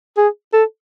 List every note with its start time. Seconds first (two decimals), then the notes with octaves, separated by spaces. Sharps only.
0.17 G#4
0.53 A4